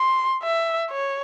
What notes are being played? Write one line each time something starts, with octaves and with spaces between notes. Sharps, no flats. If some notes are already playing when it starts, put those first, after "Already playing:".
Already playing: C6
E5
C#5